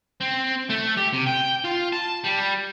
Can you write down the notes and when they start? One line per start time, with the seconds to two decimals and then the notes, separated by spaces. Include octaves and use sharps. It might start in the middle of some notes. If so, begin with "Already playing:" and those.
0.21 C4
0.69 A3
0.97 G4
1.13 C3
1.27 G5
1.64 F4
1.93 A5
2.24 G3